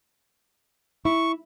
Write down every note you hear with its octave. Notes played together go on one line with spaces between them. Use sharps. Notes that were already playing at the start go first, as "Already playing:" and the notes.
E4 C#6